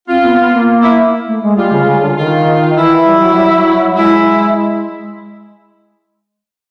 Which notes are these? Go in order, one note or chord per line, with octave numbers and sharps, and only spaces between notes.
C4 F4
B3
B3
A#3
E4
A3
G#3
G3 F4
C#3
C#3
D3
D#3 F4
E3 E4
G3
F#3
G3
F#3
G#3 E4